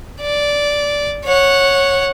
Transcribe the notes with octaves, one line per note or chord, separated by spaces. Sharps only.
D5
C#5 F#5